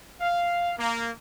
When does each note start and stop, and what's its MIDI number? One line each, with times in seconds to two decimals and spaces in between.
0.20 0.72 77
0.76 1.10 58